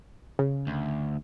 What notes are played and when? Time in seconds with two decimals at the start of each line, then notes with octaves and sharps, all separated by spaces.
0.39 C#3
0.67 D2